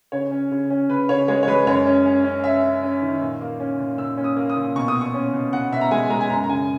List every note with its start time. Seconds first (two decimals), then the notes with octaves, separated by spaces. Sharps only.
0.12 C#3 C#5
0.31 C#4
0.51 C#3
0.70 C#4
0.89 C#3 B4
1.09 C#3 C#5
1.28 G#3 C#5
1.43 C#5
1.48 G#3 B4
1.67 F#2 C#5
1.87 C#4
2.06 C#4
2.24 C#4
2.44 C#4 E5
2.63 C#4
2.83 C#4
3.02 D#3
3.21 A#2
3.41 A#3
3.60 C#4
3.79 A#2
3.98 A#2 E6
4.17 C#4
4.24 D#6
4.36 A#3
4.50 D#6
4.56 A#2
4.76 B2 C#6
4.88 D#6
4.95 B2
5.01 C#6
5.14 C#4
5.33 B2
5.53 B2 F#5
5.72 B2 E5
5.81 A#5
5.91 G#3 G#5
6.10 G#3 A#5
6.21 G#5
6.30 F#2 A#5
6.44 A#5
6.49 C#3 G#5